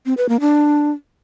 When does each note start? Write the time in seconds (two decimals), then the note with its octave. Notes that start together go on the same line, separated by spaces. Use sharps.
0.06 C4
0.17 B4
0.29 A#3
0.40 D4